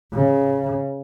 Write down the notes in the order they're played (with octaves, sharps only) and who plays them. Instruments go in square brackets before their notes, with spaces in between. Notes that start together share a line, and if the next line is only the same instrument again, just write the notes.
[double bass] C#3